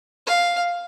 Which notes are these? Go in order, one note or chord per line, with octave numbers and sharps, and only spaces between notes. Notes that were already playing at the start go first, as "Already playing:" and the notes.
F5